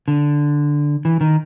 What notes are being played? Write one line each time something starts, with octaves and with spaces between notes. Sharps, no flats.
D3
E3
D#3